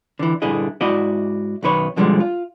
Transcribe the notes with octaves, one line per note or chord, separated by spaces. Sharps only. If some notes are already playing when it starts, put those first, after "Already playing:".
D3 E3
G2 A#2 D3 E4 G#4 D#5
G#2 E4 F#4 D5 D#5
B1 F#2 D#3 B4 C#5
G#2 B2 D3 F3 G3 G#3
F4